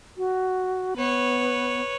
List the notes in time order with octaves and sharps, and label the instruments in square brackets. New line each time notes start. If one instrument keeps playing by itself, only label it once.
[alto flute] F#4
[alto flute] B3 [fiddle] B4 C#5